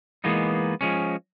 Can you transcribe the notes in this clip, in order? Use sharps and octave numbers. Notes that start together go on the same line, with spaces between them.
E3 G#3 A#3 B3 D#4
F3 G#3 C#4